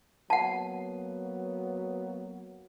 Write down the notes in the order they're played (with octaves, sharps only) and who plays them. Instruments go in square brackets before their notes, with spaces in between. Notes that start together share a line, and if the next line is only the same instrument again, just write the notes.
[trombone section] F#3 A#3 B3 [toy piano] F#5 A5